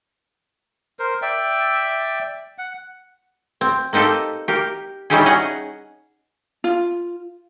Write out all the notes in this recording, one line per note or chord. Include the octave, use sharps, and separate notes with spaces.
A#4 C5
D5 E5 G5
F#5
C4
A#3 C4 D#4 G4 A4
G4 A#4
G3 C#4 D#4 E4 G4 G#4
C#4 G#4 D#5 F#5
F4